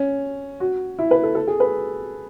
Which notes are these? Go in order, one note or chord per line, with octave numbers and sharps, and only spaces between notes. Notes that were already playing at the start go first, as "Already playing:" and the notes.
Already playing: C#4
F#4
E4
B4
A4
A4
G#4
B4